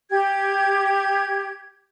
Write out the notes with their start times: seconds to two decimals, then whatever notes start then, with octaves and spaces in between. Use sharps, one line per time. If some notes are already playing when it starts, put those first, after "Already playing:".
0.11 G4 G#6